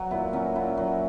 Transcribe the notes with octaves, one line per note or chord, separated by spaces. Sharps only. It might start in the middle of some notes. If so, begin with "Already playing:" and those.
Already playing: F#3 F#4
A#2 E4
F#3 C#4
A#2 E4
F#3